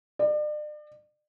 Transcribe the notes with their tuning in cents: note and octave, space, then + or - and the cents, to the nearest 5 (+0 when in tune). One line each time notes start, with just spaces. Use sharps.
D5 +40